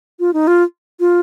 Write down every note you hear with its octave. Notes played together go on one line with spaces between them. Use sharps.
F4
D#4
F4
F4